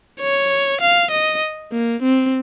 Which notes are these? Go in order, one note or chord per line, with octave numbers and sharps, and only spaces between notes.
C#5
F5
D#5
A#3
C4